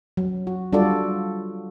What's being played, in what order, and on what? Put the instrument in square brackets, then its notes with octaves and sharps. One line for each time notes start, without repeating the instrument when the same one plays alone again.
[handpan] F#3
F#4
G3 D4 F4 F#4 A4 D5